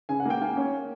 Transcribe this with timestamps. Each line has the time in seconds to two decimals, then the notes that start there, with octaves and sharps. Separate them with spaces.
0.09 C#3 G#5
0.20 F#5
0.25 A#3 G5
0.41 A#3 G#5
0.57 C#4